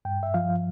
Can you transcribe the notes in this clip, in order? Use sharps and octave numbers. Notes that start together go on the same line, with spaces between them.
G2 G5
E5
F3 F5